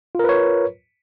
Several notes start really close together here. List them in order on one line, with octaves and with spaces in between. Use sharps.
F4 A#4 B4 C#5